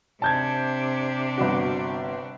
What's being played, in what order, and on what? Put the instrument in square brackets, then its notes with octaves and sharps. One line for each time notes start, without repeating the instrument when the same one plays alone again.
[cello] C3 D4 [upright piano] A5 G6 G#6
[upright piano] G1 F#4